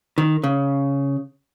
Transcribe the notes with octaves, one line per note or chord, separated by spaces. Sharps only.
D#3
C#3